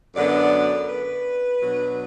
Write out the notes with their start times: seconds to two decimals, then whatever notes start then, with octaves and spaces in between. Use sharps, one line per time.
0.15 F#2 D3 B3 D4 D5
0.88 B4
1.62 B2 F#3 D4